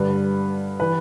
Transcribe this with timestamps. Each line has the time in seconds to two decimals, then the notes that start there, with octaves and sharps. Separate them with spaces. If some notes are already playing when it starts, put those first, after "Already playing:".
Already playing: G2 D3 B4
0.80 E3 B4